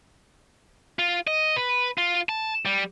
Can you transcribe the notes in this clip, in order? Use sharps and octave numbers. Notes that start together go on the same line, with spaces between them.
F4
D#5
B4
F4
A5
G3